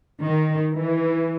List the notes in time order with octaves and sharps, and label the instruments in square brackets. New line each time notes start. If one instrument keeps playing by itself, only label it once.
[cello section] D#3
E3